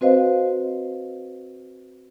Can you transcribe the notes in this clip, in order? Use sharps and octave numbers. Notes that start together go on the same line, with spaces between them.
C4 F#4 B4 C5 D#5 F5